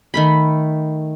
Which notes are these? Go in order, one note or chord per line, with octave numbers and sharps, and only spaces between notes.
D#3 A3 B5